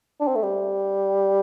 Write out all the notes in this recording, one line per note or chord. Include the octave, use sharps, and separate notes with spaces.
D4
C4
A3
G3